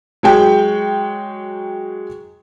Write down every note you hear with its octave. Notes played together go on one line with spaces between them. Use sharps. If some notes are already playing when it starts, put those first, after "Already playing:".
F#3 G#3 G5